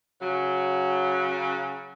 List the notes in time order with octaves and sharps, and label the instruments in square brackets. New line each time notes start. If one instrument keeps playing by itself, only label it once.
[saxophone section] C#3 F#3